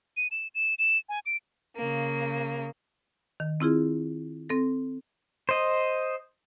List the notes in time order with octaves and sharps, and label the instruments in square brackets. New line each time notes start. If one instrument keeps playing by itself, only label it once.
[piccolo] D#7
E7
E7
E7
G#5
D7
[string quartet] C#3 A#3
[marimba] D#3
C4 E4 F4 G#4
C4 A4 A#6
[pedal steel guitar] C5 D#5